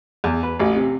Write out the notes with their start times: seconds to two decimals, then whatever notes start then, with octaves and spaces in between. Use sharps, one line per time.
0.24 E2
0.43 B4
0.59 A1
0.76 C3